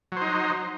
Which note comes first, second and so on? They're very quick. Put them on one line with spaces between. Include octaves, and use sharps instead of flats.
F#3 C5 D#4